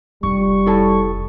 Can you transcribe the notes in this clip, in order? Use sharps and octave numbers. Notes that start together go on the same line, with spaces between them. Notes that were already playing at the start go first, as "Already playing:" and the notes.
F1 G3 F4 C#6
E4 A4 A5